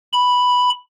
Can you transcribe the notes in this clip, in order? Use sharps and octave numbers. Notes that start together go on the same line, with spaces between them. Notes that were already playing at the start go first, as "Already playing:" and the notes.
B5